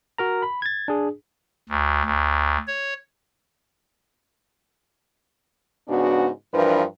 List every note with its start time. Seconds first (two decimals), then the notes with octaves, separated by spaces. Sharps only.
0.18 F#4 A#4 A#5
0.42 B5
0.62 G#6 A6
0.88 D4 G#4
1.69 D2
2.05 D2
2.68 C#5
5.89 G#2 C#3 B3 D4 F#4
6.54 G2 E3 F3 D4 A#4 B4